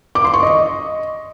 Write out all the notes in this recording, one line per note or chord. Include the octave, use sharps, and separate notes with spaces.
D6
C6
C#6
D#5